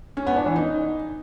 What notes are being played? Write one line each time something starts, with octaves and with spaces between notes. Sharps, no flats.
C#4
B3
D4
E3
D#4